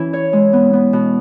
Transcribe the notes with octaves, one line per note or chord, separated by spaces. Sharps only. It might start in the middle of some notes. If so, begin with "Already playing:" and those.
Already playing: E3 C#4 E4
C#5
G#3
B3
B3
B2